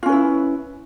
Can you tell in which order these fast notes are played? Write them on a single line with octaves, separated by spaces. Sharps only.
F4 C#4 B4 E4